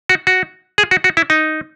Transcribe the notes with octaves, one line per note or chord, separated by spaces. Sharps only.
F#4
F#4
G#4
F#4
F#4
E4
D#4